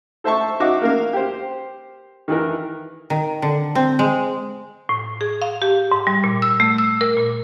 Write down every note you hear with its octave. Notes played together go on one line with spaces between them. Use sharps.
A4 C5 E5 A5 C#6
D#4 F#4 E5 F5 D6
A#3 A#4 F5
G4 C5
D#3 E3 A#4
D#3
D3
C4
G#3
A2
G#4
F5
G4
G#2
G3
A#2
E6
A3
E6
A#4
A#2